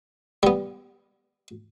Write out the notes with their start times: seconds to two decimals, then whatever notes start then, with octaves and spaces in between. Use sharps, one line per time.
0.43 G3 B3